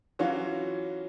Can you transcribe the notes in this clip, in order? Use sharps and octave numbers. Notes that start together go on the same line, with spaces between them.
E3 F#3 C#4 F4 F#4